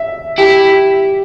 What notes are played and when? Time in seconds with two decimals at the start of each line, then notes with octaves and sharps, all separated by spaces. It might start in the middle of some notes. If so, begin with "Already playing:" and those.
Already playing: E5
0.38 E4 G4